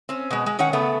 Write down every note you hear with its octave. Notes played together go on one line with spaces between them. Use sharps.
C4 C#4
B2 G#3
G#3
D#3 C#4 C#5 F#5
C#3 A3 B3